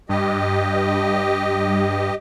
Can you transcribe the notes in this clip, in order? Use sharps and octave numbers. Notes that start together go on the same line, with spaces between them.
G2 G4 D#5